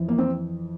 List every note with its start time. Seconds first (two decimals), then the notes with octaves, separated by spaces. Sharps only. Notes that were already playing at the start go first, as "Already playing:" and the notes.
Already playing: F2 E3
0.09 A#3
0.18 C4